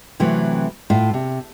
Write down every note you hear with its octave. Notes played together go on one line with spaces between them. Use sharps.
C3 E3 F#3 A3 C4
A2 F4
C3